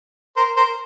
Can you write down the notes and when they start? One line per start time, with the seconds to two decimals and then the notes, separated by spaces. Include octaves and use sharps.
0.37 A#4 C5
0.57 A#4 C5